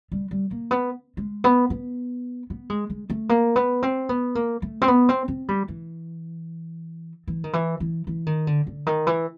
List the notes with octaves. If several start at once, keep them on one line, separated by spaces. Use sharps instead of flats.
G3
G3
A#3
B3
G#3
B3
B3
B3
G#3
G#3
A3
A#3
B3
C4
B3
A#3
A3
C4
B3
C4
C4
G3
E3
E3
D#3
E3
E3
E3
D#3
D3
D3
D#3
E3